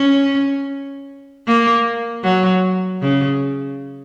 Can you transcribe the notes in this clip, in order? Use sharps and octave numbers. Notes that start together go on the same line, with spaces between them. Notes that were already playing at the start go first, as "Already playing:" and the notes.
Already playing: C#4
A#3
F#3
C#3